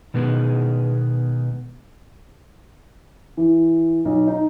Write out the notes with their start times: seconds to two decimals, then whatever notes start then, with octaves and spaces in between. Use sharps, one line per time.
0.14 B2 D#3 G#3 B3 G#4
3.37 E3
4.05 B1
4.28 D#4